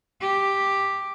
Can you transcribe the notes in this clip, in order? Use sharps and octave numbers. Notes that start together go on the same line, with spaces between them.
G4